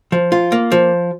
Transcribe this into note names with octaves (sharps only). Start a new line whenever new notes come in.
F3
F4
A#3
F3